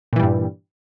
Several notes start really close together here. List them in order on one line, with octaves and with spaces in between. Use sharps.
A#2 E3 G3 G2